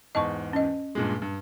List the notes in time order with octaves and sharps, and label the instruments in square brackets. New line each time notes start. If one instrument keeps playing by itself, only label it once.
[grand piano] E2 G#2 [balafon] D#5 A5 C#6
[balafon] C#4 D#5
[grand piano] G2 A#2 G#3
G2